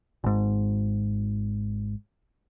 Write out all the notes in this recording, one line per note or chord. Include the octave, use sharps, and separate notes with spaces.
G#1 G#2